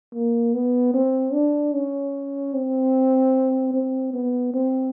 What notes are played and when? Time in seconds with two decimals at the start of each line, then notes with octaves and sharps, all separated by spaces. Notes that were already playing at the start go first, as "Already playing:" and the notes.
0.14 A#3
0.54 B3
0.94 C4
1.34 D4
1.74 C#4
2.54 C4
3.74 C4
4.14 B3
4.54 C4